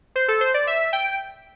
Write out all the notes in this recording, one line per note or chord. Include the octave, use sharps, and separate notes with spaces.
C5
A4
C5
D5
E5
G5